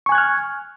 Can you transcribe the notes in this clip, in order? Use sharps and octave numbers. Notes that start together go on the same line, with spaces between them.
G#5 C#6 F6 F#6 G#6